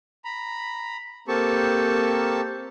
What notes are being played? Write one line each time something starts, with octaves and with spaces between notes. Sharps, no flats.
A#5 B5
A#3 C4 G4 A4 A5 C#6